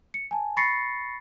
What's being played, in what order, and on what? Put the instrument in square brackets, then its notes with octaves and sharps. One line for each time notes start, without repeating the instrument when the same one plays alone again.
[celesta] C#7
G#5 A5
B5 C#6 A6 A#6 C7 C#7